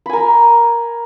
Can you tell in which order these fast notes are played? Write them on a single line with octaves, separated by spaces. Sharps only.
B5 G#5 A#4